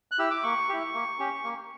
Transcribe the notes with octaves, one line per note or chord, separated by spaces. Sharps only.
F#6
E4 G4 E6
D6
A#3 C#6
E4 G4
A#3
C#4 G4
A#3